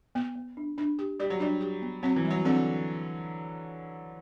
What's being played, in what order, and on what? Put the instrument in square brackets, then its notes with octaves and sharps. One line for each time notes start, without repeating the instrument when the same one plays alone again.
[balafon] B3
B3
D4
D4
G4
[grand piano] G3 [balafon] G4
[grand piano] F#3
[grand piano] G3 [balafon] D4
[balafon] G4
B3
[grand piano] F#3 [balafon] C4
[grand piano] E3
[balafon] G3
[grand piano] F#3
[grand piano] D3 [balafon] C4